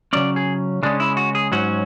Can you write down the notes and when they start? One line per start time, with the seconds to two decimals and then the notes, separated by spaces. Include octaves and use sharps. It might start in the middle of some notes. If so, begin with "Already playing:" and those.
0.13 C#3 F#3 C#4 D5
0.36 G#4
0.83 C#3 G#3 C#4 D4
1.00 E4
1.17 F#4
1.35 G#4
1.52 G#2 F#3 C#4 F#4